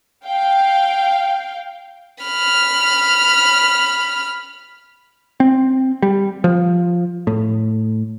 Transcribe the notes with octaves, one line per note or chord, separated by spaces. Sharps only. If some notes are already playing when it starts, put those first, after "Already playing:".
F5 G5
B5 F6
C4
G3
F3
A2